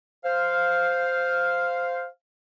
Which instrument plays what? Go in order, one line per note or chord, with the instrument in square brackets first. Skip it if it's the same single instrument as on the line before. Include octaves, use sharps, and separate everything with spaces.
[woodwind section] C5 F5